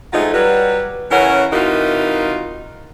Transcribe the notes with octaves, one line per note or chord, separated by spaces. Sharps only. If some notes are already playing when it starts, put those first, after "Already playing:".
F3 F#3 G#3 A3 D#4 F4
F#3 G3 B4
C#3 E3 C#4 A#4 C#5 F#5
C3 E3 D#4 F4 F#4 A#4